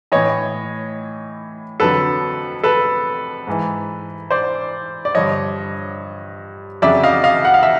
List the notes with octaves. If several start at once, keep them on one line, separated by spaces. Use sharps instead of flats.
A2 E3 C#5 D#5
F2 D3 F#3 A4 B4
A4 B4
G#2 E3
C5 D5
D5
G2 D3 F3 C#5 D#5
F2 C#3 F#3 D5 E5
D#5 F5
D#5 F5
F#5
F5
E5